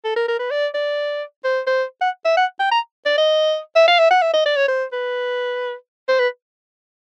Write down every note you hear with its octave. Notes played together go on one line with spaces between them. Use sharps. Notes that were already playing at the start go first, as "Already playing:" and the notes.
A4
A#4
A#4
B4
D5
D5
C5
C5
F#5
E5
F#5
G5
A#5
D5
D#5
E5
F5
E5
F#5
E5
D#5
D5
C#5
C5
B4
C5
B4